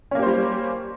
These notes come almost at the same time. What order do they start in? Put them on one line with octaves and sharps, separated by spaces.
C#4 A#3 G4 C5 G3